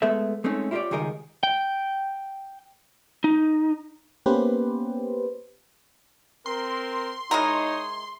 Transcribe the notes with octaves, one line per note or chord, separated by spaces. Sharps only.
G#3 A3 B3 A4 E5
G#3 A3 C4 C#4 D#4
E4 F4 G4 A#4 C#5 D5
C#2 D#3 G3 G#4 A#4 D#5
G5
D#4
A#3 B3 C#4 G4 B4 C5
C4 A#4 C6
G#3 D#4 E4 A#4 C#5 D#6